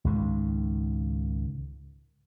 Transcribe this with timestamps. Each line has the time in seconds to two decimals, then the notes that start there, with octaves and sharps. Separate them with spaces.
0.05 C#2 G#2 D#3